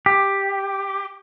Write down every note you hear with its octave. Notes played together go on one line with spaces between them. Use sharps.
G4